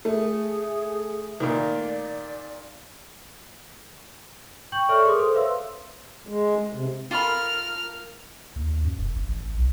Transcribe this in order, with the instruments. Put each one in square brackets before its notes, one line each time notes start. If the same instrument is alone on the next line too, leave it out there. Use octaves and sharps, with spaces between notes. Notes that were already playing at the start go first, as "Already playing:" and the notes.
[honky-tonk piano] A3 [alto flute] G#4
[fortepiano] A#2 D#3 [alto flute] D5
[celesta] G5 C#6 G6 F#7
A4 C#5 D5 E5 C#6 F6
G#4 A#4 C6 D6 D#6
A4 C5
B4 C#5 E5 F5 C6 E6
[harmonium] G#3
C3
[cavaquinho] F4 A4 B5 [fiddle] A#4 F6
[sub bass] D#2
F#2
E1
G#1
A1
B1